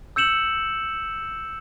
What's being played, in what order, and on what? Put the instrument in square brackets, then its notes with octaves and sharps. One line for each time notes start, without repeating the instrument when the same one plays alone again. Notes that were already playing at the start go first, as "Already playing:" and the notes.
[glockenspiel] E6 G6 C#7 E7 F#7